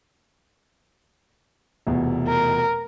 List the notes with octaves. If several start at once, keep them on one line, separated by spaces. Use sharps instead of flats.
F1 E2 B2
A#4